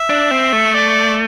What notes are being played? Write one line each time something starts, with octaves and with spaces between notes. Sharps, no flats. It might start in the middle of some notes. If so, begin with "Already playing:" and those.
Already playing: E5
D4
C4
A3
D5